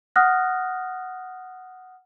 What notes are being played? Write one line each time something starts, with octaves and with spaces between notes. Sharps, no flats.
F#5 D#6 F6 F#6 A#6